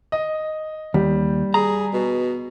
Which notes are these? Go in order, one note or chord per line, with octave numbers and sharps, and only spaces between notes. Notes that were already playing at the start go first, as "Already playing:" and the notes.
D#5
D#2 G3
G#4 A#5
B2